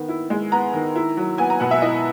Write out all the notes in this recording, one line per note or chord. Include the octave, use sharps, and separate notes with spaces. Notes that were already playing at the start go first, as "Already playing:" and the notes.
Already playing: D#3 B3
E4
G#3
B3 A#5
D#3
E4
F#3
B3 G#5
A#5
B2 F#5
E5
E4 D#5